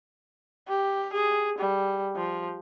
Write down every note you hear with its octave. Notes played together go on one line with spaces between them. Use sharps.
G4
G#4
G3
F3